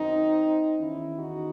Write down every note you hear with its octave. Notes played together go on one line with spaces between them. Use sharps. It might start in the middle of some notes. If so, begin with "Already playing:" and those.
Already playing: F#2 D#3 C4 D#4
E2 D#3 C#4 E4
D#4 F#4